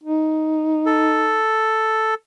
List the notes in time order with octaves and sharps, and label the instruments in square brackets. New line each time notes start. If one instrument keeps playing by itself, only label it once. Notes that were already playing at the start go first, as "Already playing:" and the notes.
[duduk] D#4
[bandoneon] A4